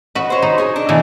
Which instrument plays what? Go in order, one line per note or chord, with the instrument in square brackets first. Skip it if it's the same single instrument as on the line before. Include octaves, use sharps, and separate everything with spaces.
[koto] F#4 B4 [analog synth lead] D#5
[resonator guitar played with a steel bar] C5 C#5
[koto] D#4
[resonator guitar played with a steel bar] G#4 C#5
D4
[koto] B2 E3 [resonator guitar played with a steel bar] A3